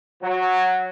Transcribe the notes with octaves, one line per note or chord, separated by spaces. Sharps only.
F#3